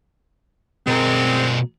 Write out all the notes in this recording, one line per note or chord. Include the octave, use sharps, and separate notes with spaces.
B2 G#3 C4 A#4